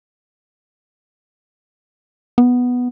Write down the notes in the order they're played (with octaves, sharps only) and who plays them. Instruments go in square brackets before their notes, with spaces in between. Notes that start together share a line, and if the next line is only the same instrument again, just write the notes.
[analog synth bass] B3